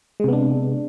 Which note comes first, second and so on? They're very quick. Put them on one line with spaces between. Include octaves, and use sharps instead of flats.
G#3 C3 B3 D4